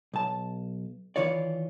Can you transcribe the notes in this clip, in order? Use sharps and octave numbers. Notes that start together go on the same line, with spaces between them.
B1 A5
D#3 E3 F4 C#5 D5